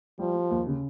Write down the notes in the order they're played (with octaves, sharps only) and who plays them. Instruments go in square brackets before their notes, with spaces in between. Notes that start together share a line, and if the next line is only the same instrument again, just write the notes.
[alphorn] F3 [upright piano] G3
[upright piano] G3
D#2
C#3